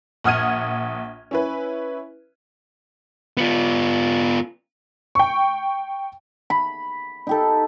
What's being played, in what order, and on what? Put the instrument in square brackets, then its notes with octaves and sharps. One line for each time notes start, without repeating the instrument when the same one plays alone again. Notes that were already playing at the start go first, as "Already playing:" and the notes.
[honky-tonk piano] A#1 F#5 D#6 F6 G#6 D#7
C#4 E4 B4
[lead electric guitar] B3 F4
[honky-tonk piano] G5 C#6
[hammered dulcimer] B5
D#4 G4 A4